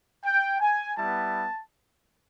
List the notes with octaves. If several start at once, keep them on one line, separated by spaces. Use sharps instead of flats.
G5
G#5
G3 B3 E4 A5